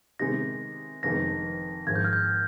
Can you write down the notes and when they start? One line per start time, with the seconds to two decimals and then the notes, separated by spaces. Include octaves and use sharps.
0.19 C3 D#3 G#3 D#4 G4 A#6
1.03 F1 F2 D#3 G#3 D#4 A#6
1.87 G#1 G#2 F3 G#3 G#6
1.96 G6
2.04 F6
2.13 G6